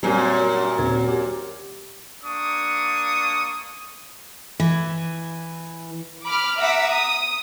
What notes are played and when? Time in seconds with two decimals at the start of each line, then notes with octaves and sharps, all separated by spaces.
0.03 F#2 A#2 G3 C4 F#4
0.78 D#1 C4 G#6
1.08 G4
2.24 A#3 D4 C#6 D#6
4.60 E3
6.25 B5 D6 F6
6.58 E5 F#5 A#5 D6 E6 B6
6.88 D#6